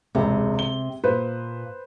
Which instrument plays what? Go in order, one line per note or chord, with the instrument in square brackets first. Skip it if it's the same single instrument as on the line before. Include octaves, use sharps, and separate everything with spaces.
[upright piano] E1 C#2 [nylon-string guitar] C3
[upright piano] G7
[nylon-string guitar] A#2 [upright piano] B4 C5